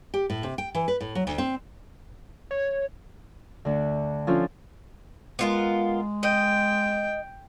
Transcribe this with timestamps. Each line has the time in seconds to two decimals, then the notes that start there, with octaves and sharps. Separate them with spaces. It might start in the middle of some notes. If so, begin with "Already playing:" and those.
0.14 G4
0.30 A2
0.43 C3
0.58 G5
0.75 E3
0.88 B4
1.01 A2
1.15 F#3
1.27 D2
1.38 C4
2.51 C#5
3.65 D2 D3
4.27 F3 C#4 D4 F4 A4
5.39 G#3 B3 F4 A#4
6.23 D#5 G5